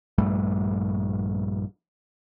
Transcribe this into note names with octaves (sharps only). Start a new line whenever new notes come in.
A#1 G2 G3 A3